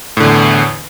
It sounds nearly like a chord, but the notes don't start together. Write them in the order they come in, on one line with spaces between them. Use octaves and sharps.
A2 D3 E2